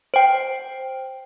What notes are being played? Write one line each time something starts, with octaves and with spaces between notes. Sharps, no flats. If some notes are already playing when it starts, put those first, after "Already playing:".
C5 G5